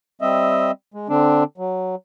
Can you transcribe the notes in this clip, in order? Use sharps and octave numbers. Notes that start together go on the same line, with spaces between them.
G3 C4 D#5 E5
G#3
D3 C4 D4
F#3